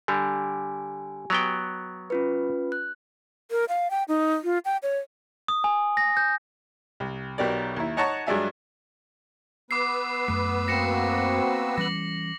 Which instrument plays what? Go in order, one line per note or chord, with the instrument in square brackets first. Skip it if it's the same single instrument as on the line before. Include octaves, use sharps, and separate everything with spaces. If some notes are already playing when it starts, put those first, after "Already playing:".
[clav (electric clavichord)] D3 G3 [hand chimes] G4 G#5
[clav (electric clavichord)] F#3 B3 G5
[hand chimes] C#4 F4 B4
F#6
[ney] A#4
F5
G5
D#4
F4
G5
C#5
[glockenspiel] D#6
G#5
A#6
G6
[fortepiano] C2
B1 B2 G4 A#4 D5
D#2 E4
D#4 C#5 F#5 A5 A#5 C#6
G2 F#3 G#3 D4 E5 G#5
[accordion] B3 B4 E6 [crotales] D6 C7
[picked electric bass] F#2 A3 [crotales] C7
[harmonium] A#3 C4 F#4 [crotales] A#6 C#7 E7
[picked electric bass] E3 G3 C#4 [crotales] A#6 F#7